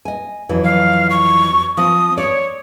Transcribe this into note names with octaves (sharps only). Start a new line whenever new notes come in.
D#5 G#5
F2 E3 F#3
F5
C#6
F3 C4 D#6
C#5 D5